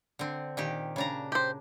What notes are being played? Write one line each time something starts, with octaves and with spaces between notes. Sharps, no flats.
D3 C4
A#2 D#3 G4
C#3 D4 A#5
G4 C5